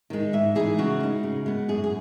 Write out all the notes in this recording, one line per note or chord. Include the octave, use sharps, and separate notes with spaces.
D#3 G#3 D#4
G#2 E5
E3 G#3 D#4 G#4
C#3 F#4
G#3 B3 D#4
C#3
G#3 B3
F#2 G#4
G#4